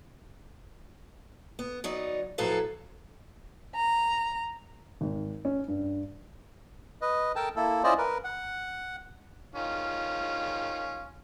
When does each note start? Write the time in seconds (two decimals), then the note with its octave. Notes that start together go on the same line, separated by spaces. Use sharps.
1.59 B3
1.84 F#3 B3 D#4 D5
2.38 A2 F3 F#3 A4 B4 F5
3.74 A#5
5.01 G#1
5.45 C#4
5.68 G2
7.02 B4 D#5
7.36 A4 A#4 G5 A5
7.56 A#3 E4 A4
7.84 C#4 E4 F4 C5 D5 D#5
7.98 A#4 B4
8.24 F#5
9.55 D#3 C#4 F4